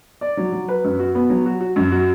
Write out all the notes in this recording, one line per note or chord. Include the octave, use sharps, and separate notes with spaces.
D5
F#3
F#3
B4
F#2
F#4
B3
F#3
F#4
F#4
F#2
F#4